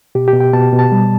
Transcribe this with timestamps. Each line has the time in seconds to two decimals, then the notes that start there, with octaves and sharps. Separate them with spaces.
0.15 B2 G4
0.28 G4
0.33 B2
0.40 G5
0.53 B2 A5
0.73 B2
0.79 A5
0.92 G3